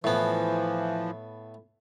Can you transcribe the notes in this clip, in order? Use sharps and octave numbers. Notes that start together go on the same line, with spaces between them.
A2 E3 F3 B3